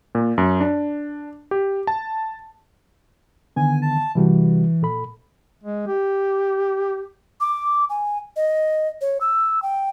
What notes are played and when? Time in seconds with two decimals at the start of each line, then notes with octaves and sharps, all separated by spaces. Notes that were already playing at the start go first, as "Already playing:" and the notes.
0.15 A#2
0.38 F#2
0.60 D4
1.51 G4
1.87 A5
3.56 D3 D#3 B3 G#5
3.82 A5
4.15 C3 E3 G3 F#4
4.82 A#2 A4 B5
5.63 G#3
5.87 G4
7.41 D6
7.90 G#5
8.36 D#5
9.01 C#5
9.21 E6
9.62 G5